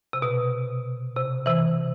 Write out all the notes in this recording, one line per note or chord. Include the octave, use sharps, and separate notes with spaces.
C3
B2
C3
C3 E3